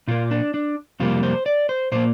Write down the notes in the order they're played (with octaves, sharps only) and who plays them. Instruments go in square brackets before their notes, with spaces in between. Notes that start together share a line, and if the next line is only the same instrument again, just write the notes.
[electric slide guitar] A#2 A#3 F4
D4
D4
F2 C3 G3 A#3 F4
C5
D5
C5
A#2 A#3 C5